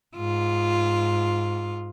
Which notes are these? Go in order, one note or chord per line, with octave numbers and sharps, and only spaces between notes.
G#2 F4